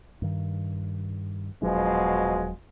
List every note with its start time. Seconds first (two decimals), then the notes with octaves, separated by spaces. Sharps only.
0.22 G2 D#3
1.62 D#1 B2 F3 F#3 G#3 D4